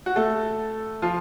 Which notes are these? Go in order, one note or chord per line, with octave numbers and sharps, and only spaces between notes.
F#4
A3 A4
F3 F4